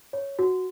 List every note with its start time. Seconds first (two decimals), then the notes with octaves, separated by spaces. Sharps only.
0.13 C#5
0.39 F#4